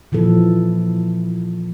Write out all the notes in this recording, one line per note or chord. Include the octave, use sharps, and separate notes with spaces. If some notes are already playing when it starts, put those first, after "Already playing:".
A#2 E3 F3 A4